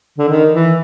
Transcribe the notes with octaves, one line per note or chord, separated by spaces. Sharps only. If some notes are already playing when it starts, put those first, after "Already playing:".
D3
D#3
E3